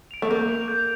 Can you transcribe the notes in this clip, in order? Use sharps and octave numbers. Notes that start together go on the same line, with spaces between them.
D7 F7
A3
A#3 G6
D7 F7
G6